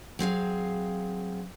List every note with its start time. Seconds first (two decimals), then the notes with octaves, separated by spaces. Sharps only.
0.19 F#3 C4 G#4 F5